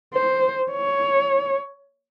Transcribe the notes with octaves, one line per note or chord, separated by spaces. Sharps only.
C5
C#5